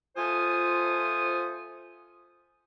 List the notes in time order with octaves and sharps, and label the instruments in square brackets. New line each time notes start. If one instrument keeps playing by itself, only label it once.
[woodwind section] F3 A3 F4 C5 G#5 D#6